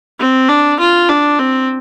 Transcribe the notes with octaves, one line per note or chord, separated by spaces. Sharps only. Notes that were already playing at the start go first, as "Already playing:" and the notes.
C4
D4
F4
D4
C4